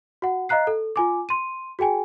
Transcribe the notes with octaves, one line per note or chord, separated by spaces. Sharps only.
F#4 F#5
D#5 F5 A#5 F#6 C7
A4
F4 G#5 D6
C6 D#7
F#4 G#4 G5 G#5